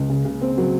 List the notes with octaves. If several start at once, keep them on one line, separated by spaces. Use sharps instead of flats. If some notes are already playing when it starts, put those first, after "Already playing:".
Already playing: C#2 C#4
C#3
C#3
C4
F#3